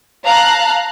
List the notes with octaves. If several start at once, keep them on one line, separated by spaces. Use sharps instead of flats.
F5 A5 A#5 F#6